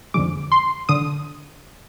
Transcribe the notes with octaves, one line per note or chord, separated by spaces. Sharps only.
F2 D3 F3 G#3 D6
C6
D3 D#6